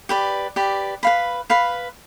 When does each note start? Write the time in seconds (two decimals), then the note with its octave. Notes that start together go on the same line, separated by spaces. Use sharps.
0.09 G4 B4 D5
0.56 G4 B4 D5
1.03 B4 F5 B5
1.50 B4 F5 B5